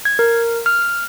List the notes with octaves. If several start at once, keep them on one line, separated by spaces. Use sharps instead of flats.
G#6
A#4
F6